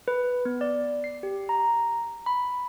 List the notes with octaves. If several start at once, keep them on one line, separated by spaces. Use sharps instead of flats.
B4
B3
D5
C7
G4
A#5
B5